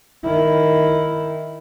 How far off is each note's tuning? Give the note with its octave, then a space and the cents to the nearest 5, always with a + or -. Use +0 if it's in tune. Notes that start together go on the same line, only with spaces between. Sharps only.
D#3 +0 E4 +0